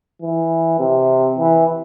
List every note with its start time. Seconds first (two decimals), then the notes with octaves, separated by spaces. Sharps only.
0.22 E3
0.79 C3
1.38 E3